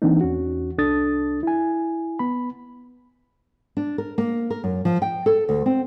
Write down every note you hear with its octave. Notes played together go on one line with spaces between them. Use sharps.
E3 A#3 C4 D4 D#4
E2 C#4 F#4
C2 D4 A4 D#6 A6
E4 G#5
B3 B5
D4
A#4
A#3
A#4
F#2
F3
G5
A4
D2
C4